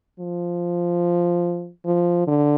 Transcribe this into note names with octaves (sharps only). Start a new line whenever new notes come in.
F3
F3
D3